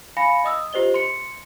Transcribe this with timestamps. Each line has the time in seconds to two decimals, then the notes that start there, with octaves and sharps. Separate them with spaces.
0.17 F5 G#5 B5 A#6 C#7
0.44 D#5 D#6 E6
0.73 F4 G4 C5 D#5 G7
0.94 C6 C#7